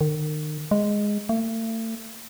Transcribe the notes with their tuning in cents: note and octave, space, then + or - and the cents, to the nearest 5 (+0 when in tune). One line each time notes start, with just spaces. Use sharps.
D#3 -35
G#3 -5
A3 +40